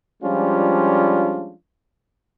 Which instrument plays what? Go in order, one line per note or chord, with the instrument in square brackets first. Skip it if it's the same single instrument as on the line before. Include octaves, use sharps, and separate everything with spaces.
[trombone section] F3 G3 G#3 C#4 D4 F4